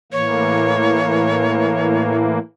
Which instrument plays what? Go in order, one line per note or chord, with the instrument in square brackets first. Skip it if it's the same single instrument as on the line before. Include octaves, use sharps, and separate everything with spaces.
[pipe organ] A2 E3 A#3 [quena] C#5